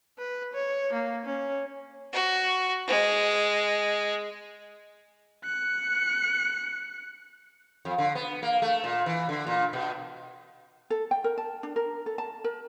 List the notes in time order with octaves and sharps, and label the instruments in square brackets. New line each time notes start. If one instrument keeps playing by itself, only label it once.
[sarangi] B4
C#5
A#3
C#4
[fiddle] F#4
G#3
[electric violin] F#6 C#7
[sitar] F2
D3
B3
A#3
A3
A#2
E3
D3
A#2
B2
[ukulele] A4
G5
A#4
A5
D4
A#4
A4
A5
A#4